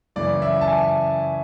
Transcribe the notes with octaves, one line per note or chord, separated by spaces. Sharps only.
F#2 C#3 E3 D5
E5
A5
G#5